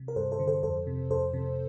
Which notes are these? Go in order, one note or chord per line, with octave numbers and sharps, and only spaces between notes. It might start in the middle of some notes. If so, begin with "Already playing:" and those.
Already playing: C3
A#4
G2 A4 C5
A4 C5
D3
A4 C5
F2 A4 C5
C3
F2 A4 C5
C3